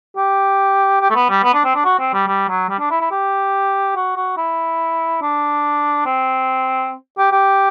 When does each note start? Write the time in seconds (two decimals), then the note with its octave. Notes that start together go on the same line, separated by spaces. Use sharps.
0.17 G4
1.01 G4
1.10 A3
1.15 B3
1.30 G3
1.43 B3
1.54 D4
1.64 C4
1.75 D4
1.85 F#4
1.99 C4
2.13 G3
2.28 G3
2.49 F#3
2.70 G3
2.79 D4
2.91 E4
3.01 E4
3.11 G4
3.96 F#4
4.17 F#4
4.37 E4
5.22 D4
6.06 C4
7.18 G4
7.32 G4